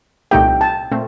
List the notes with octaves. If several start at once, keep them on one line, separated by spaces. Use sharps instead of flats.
C2 A#2 A3 D#4 G4 G5
A5
A#2 A3 C4